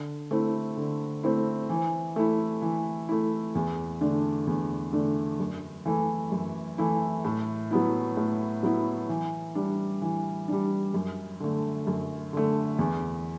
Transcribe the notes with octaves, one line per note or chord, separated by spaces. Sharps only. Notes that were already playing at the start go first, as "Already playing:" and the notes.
Already playing: D3
A3 C4 E4
D3
A3 C4 E4
E3
A3 E4
E3
A3 E4
E2
D3 A3 D4
E2
D3 A3 D4
F#2
E3 A3 E4
F#2
E3 A3 E4
A2
F#3 B3 E4
A2
F#3 B3 E4
E3
G3 D4
E3
G3 D4
F#2
D3 A3
F#2
D3 A3
E2